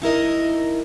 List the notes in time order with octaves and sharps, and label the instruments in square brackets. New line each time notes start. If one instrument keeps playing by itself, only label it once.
[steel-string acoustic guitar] D#4 E4 A#4 D#5